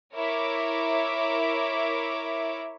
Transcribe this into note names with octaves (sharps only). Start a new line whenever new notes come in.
E4 A#4 C#5 E5 D6